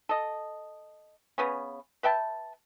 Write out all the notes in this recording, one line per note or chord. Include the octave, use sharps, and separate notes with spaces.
A4 D#5
C#3 B3 C#4
B4 E5 G5 A5